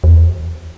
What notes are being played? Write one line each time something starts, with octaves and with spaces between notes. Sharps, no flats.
E2